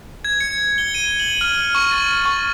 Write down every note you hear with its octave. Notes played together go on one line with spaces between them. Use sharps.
G#6
C#7
G7
D#7
F#7
F6
C#6
A6
C#6